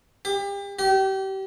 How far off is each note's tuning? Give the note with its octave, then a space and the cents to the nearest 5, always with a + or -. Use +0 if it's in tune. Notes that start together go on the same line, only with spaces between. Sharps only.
G4 +35
G4 -30